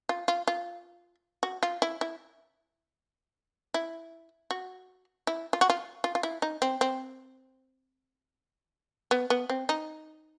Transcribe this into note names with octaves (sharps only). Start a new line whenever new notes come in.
F4
F4
F4
F#4
F4
E4
E4
E4
F#4
E4
F4
F#4
F4
F4
F4
E4
D#4
C4
C4
B3
B3
C4
D#4